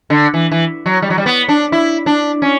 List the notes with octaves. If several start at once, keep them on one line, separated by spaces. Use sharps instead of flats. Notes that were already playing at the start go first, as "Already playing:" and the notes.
D3
E3
E3
F#3
G3
F#3
G3
B3
D4
E4
D4
C#4